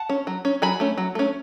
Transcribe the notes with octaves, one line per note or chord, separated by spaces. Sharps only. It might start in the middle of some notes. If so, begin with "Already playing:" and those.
Already playing: F#5 A5
C#4
F#3
C#4
F#3 G#5 B5
A3 C#4
F#3
A3 C#4